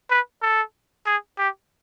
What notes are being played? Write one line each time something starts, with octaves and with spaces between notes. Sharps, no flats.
B4
A4
G#4
G4